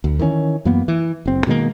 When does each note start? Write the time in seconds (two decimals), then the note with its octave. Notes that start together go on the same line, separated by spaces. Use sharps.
0.04 D2
0.19 D#3 E3 A3 C#4
0.65 F#2 E3 A#3 B3
0.88 E3
1.26 F#1 C4
1.47 B2 D#3 G#3 A#3